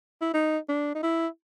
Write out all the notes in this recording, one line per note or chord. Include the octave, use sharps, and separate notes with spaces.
E4
D#4
D4
D#4
E4